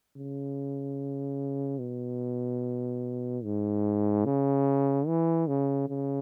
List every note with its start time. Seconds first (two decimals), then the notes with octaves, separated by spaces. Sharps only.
0.17 C#3
1.80 B2
3.44 G#2
4.25 C#3
5.07 E3
5.47 C#3
5.89 C#3